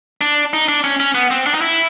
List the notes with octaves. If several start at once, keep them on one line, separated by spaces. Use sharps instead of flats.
D4
D#4
D4
C#4
C#4
B3
C4
D4
D#4
E4